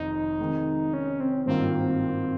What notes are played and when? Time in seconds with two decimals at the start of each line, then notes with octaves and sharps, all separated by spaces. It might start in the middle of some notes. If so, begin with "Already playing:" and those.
Already playing: F1 F2 D#3 D#4
0.39 C3 D#3 G#3
0.93 C#4
1.20 C4
1.46 G#1 G2 D#3 A#3 C4 F4